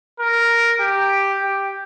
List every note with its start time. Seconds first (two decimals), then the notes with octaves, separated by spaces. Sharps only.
0.20 A#4
0.80 G4
1.43 G4